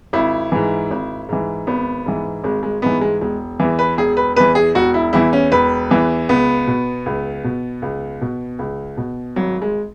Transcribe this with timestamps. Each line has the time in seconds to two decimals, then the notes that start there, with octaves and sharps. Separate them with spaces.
0.13 G#1 E4
0.52 G#2 E3
0.91 G#1
1.29 G#2 E3
1.67 G#1 B3
2.05 G#2 E3
2.44 G#1 G#3
2.63 G#3
2.82 G#2 E3 B3
3.01 G#3
3.21 E1 G#3
3.60 E2 E3
3.79 B4
3.97 E1 G#4
4.17 B4
4.36 E2 E3 B4
4.55 G#4
4.75 E1 F#4
4.94 E4
5.13 E2 E3 E4
5.33 C#4
5.52 E1 B4
5.90 E2 E3
6.29 C#2 B3
6.67 B2
7.06 C#2
7.44 B2
7.82 C#2
8.22 B2
8.59 C#2
8.97 B2
9.36 G#1 F#3
9.62 G#3